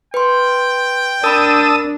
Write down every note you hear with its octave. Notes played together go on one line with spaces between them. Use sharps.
B4 G5 C6
D4 A#4 A5 B5 D#6 E6